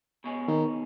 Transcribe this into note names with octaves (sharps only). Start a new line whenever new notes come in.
B2 G#3 C#4
D#3